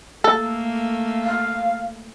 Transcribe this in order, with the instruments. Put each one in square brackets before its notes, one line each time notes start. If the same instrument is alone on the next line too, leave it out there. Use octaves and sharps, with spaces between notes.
[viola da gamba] A3 A#3 [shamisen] A4
[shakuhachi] F5